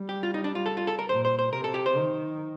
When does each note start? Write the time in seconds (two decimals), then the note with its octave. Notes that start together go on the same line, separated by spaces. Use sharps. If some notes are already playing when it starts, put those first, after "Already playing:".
Already playing: G3
0.09 G4
0.23 F4
0.34 D#4
0.44 D4
0.55 F4
0.66 A4
0.77 F4
0.87 A4
0.99 A#4
1.09 A#2 C5
1.25 C5
1.39 C5
1.53 C3 A#4
1.64 A4
1.74 G4
1.86 C5
1.96 D#3